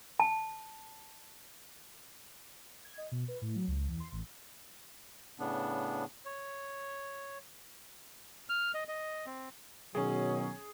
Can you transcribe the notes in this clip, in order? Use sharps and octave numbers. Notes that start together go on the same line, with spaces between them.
A5
G#6
D#5
B2
B4
A2
F#3
C#2
E2
C6
A1
A2 C#3 B3 D4
C#5
F6
D#5
D#5
C4
B2 D#3 F#3 C#4 G#4